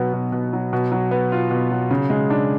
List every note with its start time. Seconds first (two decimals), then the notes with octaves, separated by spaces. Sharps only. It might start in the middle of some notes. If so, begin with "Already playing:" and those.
Already playing: B2 F#3 B3
0.13 B2
0.32 B2
0.53 F#3
0.73 B2
0.92 F#3
1.11 B3
1.32 F4
1.51 B2
1.71 F#3
1.91 C#3
2.10 G#3
2.30 D4